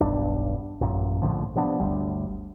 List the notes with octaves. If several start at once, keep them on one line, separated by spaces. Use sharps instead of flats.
E1 B1 G2 D4
A1 F#2 A#2
A#1 A2 D3 F3
C3 F3 B3 D4
G1 D2 G3